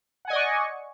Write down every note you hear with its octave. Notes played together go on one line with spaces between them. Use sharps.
D5 D#5 F#5 G#5 C#6